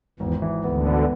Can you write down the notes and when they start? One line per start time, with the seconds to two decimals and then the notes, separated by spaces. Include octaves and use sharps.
0.19 G#1 E2 E3
0.42 E3
0.64 D2 D3 B3
0.87 B3